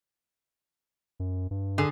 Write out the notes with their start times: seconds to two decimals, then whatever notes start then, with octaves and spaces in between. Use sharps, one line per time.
1.20 F#2
1.51 G2
1.78 D3 G#4